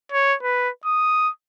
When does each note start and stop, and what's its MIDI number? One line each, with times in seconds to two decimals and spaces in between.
0.12 0.35 73
0.43 0.70 71
0.85 1.29 87